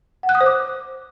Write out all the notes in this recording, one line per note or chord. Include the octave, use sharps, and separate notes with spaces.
F#5
F#6
D#6
C5
D6